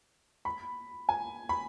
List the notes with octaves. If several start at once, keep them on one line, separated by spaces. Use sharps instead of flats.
B5
G#5
B5